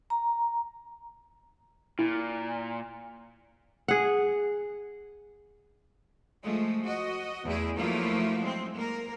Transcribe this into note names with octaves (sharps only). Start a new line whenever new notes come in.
A#5
A#2 E4
G#4 F#5
F3 G#3 A3
F#4 D#5
E2 A3 E4 G#4
F3 F#3 A3 A#3 E4 F4
G#3 C4
A#3 A#4